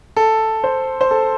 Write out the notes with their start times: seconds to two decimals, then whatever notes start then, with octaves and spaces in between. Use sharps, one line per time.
0.17 A4
0.64 C5
1.01 C5
1.11 A4